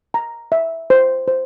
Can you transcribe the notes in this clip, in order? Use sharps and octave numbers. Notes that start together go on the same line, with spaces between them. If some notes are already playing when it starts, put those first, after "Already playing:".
A#5
E5
C5
C5